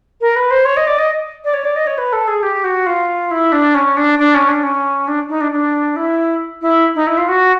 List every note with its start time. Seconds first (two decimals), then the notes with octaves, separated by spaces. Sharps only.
0.21 A#4
0.36 B4
0.51 C5
0.65 C#5
0.77 D#5
0.87 D5
0.98 D#5
1.44 D5
1.54 C#5
1.64 D5
1.76 D#5
1.87 C#5
1.98 B4
2.13 A4
2.28 G#4
2.43 G4
2.64 F#4
2.86 F4
3.31 E4
3.52 D4
3.75 C#4
3.97 D4
4.19 D4
4.34 C#4
4.48 D4
4.63 C#4
5.08 D4
5.29 D#4
5.41 D4
5.52 D4
5.96 E4
6.62 E4
6.95 D#4
7.07 E4
7.17 F4
7.28 F#4